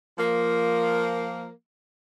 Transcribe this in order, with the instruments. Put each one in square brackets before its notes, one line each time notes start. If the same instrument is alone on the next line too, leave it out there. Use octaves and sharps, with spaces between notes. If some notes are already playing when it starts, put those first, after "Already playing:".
[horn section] F3 A#3